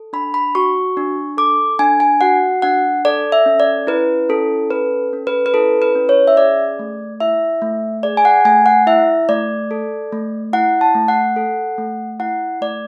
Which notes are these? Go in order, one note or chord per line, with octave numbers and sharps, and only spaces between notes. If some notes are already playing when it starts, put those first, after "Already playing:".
Already playing: A4
D4 B5
B5
F#4 C#6
D4
A4 D6
D4 G#5
G#5
F#4 F#5
D4 F#5
A4 D5
E5
C#4
D5
E4 B4
C#4 A4
A4 B4
C#4
B4
B4
E4 A4
B4
C#4
C#5
E5
G#4 D5
A3
E4 E5
A3
G#4 D5
G#5
F#5
A3 G#5
F#5
E4 E5
A3 D5
A4
A3
E4 F#5
A5
A3
F#5
A4
A3
E4 F#5
A3 D5